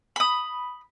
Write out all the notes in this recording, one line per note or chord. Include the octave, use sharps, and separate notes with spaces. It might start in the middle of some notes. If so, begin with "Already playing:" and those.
B5 D#6